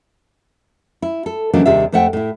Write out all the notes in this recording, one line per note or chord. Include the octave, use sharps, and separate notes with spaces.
E4
A4
C#3 E3 F#3 A#3 D4 D#4
D#2 C3 G3 D4 G#4 E5
F2 A3 C5 E5 F#5 G5
A2 E4